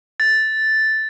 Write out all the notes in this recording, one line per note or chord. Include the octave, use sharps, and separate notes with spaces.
A6